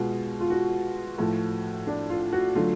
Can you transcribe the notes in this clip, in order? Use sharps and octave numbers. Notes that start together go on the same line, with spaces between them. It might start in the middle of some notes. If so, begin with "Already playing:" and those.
Already playing: B2 G#3 F4
F4
F#4
A2 F3 A3
D4
F4
F#4
D3 F#3 A3 F4